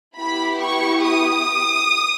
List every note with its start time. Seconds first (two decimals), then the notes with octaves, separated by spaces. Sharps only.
0.19 B3 E4 G4 B5
0.62 C#6
1.06 D#6